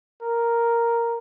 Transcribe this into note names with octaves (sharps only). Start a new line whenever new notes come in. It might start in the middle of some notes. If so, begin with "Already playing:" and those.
A#4